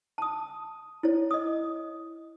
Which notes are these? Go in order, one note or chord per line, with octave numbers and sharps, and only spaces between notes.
A5 D#6
E4 C#5
D#5 D#6